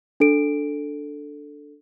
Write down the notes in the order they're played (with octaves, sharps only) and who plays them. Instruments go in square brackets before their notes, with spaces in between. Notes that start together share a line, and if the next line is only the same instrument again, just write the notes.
[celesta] D4 A4 D7